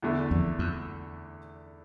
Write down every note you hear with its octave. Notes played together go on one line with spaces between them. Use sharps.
E2 D3 A3
F2
F2